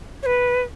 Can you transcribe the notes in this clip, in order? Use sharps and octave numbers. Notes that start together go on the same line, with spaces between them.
C#5
B4